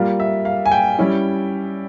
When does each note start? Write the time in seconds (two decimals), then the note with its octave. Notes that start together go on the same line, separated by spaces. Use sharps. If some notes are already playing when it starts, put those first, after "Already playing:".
Already playing: G3 A#3 F4
0.20 E5
0.45 F5
0.66 G#5
0.72 G5
0.99 G3 C#4 E4